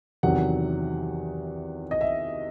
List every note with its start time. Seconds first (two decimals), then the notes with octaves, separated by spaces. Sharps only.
0.23 E2 C3 D#3 F#3 F#5
1.91 D#5
2.01 E5